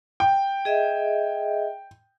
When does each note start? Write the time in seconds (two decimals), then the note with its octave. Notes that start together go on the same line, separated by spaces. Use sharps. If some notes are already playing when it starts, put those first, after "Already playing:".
0.20 G5
0.65 G#4 D#5 E5